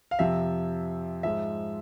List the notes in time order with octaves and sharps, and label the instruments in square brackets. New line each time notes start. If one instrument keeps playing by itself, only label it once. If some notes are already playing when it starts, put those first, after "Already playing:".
[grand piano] F5
F2 C3 F3 E5
G#2 F3 G#3 E5